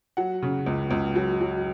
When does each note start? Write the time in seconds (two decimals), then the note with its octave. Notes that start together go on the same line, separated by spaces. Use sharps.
0.17 F#3 F#5
0.42 C#3
0.66 C#2
0.91 C#2
1.16 F#3
1.41 F#3